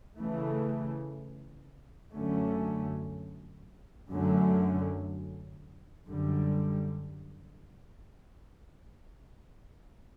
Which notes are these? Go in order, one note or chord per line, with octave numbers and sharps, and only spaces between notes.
C#3 E3 A3
F#2 D3 F#3 A3 C#4
F#2 D3 F#3 A3 C#4
F#2 D3 G3